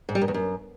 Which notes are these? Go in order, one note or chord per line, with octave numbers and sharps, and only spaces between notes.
G#2
G3
F#2
E2
F#2